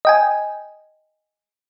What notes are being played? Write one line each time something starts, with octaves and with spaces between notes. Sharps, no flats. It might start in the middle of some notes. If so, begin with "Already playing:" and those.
D#5 G5 G#5